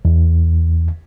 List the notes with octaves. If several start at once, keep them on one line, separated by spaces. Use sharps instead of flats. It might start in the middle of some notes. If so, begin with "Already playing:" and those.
E2